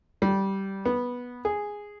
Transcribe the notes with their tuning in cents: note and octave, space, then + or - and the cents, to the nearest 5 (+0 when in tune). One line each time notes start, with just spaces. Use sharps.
G3 -10
B3 -10
G#4 -5